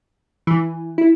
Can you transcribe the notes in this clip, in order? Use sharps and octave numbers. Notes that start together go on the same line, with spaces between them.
E3
E4